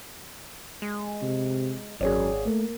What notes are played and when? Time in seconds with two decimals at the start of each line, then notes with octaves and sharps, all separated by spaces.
0.82 G#3
1.22 C3
2.01 G#1 F#2 G#4 C#5 D5
2.46 A3 A#3